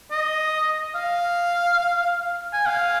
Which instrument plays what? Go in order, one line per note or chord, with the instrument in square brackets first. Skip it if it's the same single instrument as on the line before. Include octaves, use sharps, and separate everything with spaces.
[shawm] D#5
F5
G#5
F5